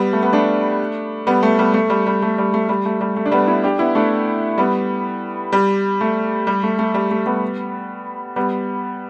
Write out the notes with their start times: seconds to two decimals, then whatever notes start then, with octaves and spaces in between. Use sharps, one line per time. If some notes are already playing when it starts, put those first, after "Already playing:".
Already playing: G3 B3
0.13 A3
0.23 B3
0.33 A3 D4
1.27 G3 B3
1.43 A3
1.59 G3 B3
1.74 A3
1.90 G3
2.07 G3
2.22 A3
2.38 G3
2.54 A3
2.69 G3
2.85 A3
3.01 G3
3.16 A3
3.25 D4
3.32 G3 B3
3.47 B3 E4
3.63 D4 G4
3.79 B3 E4
3.95 A3 D4
4.58 G3 B3
5.52 G3
6.01 A3
6.47 G3
6.63 A3
6.79 A3
6.94 G3
7.11 A3
7.26 G3 B3
8.36 G3 B3